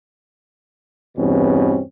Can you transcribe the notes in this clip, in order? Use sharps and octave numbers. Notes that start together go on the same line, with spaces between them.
E2 G2 B2 E3 C4 C#4